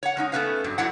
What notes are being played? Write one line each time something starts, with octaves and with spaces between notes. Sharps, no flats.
C#5 F#5
G#3 C#4 D#4
A3 B3 C#4 B4 C#5 F5
G2 F#3
F#3 G3 A3 E4 F#4 F#5